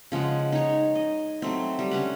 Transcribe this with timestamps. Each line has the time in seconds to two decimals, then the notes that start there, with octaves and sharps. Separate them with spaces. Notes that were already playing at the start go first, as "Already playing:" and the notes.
0.12 C#3 F3 G#3 F#5
0.52 D#4 C#5
0.95 D#5
1.42 F#3 A3 C4
1.79 G3
1.91 D3 C#4 B4 F#5